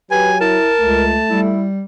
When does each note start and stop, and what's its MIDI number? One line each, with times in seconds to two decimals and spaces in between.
0.11 0.58 54
0.11 0.38 67
0.11 0.31 71
0.11 0.38 80
0.41 0.72 64
0.41 1.04 70
0.41 1.40 81
0.81 1.17 37
0.81 1.54 57
1.30 1.84 55
1.30 1.65 64